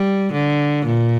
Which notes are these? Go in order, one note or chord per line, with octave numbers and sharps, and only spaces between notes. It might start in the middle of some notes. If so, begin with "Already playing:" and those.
Already playing: G3
D3
A#2